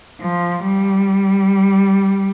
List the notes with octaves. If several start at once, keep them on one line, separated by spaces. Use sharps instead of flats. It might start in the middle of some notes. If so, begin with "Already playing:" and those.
F3
G3